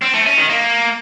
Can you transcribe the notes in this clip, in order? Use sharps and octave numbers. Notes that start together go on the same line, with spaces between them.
C4
A3
C#4
D#3
A#3